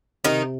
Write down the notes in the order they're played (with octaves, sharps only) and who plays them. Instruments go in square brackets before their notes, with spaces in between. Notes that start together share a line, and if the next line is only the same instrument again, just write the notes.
[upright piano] C3 [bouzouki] D#3 D#4